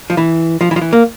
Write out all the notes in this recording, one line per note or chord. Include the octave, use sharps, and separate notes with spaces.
F3
E3
F3
E3
F3
E3
A#3